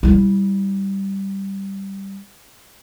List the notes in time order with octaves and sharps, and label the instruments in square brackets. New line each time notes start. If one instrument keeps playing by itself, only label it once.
[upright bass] G3 E4